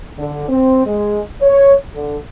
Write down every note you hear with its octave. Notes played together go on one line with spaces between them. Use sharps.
D3
C4
G#3
C#5
D3